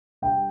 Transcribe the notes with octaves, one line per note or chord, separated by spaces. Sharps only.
D3 G3 G5